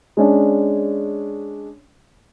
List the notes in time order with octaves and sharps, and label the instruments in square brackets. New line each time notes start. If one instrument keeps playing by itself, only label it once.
[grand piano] G#3 C#4 D4